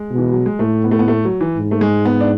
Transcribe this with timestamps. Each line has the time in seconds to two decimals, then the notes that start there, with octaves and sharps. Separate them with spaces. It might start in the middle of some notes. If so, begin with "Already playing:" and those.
Already playing: G#3
0.11 B2
0.18 E3
0.32 F#3
0.46 G#3
0.59 A2 A3
0.84 B3
0.91 A3
0.99 B3
1.08 A3
1.25 F#3
1.41 E3
1.57 G#2
1.71 A3
1.81 G#3
2.05 B3
2.20 D4